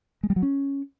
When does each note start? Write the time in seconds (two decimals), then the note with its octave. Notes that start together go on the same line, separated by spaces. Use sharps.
0.23 G#3
0.30 G3
0.36 F#3
0.43 C#4